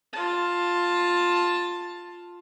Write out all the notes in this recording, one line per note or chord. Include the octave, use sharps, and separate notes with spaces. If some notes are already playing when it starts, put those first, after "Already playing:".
F4 A5